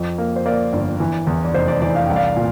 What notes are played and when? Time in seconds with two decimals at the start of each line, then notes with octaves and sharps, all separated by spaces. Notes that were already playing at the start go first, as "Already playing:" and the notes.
Already playing: F2
0.18 A#3
0.36 C5
0.46 A#3 D5
0.73 G1
1.00 E3
1.27 E2
1.45 D5
1.54 F1 C5
1.68 D5
1.82 E3 D5
1.95 F5
2.06 C2 G5
2.16 D5 F5
2.36 A#2